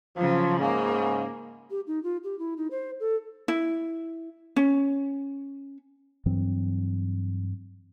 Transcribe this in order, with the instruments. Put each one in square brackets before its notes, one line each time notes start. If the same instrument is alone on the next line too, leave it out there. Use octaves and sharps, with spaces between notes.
[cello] C#3 F#3 [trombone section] F3
[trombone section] G#2 C#3 [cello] A#3
[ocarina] G4
D#4
F4
G4
E4
D#4
C5
A4
[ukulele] E4
C#4
[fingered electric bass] G2 E3 F#3 C4